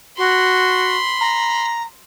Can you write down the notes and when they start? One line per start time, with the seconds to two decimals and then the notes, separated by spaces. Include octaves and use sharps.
0.18 F#4 B5 C6
1.20 A#5